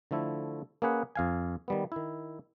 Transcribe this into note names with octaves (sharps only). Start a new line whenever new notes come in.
D3 F3 A3 E4
A#3 C#4 G#4 B4 F#5
F2 F5 G#5
D#3 G3 B3
D#3 E4